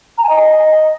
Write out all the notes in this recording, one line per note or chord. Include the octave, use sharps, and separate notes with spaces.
A#5
G#5
D#5